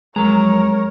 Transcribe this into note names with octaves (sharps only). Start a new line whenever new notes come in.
F2 F#3 G#3 A#4 C#5 A#5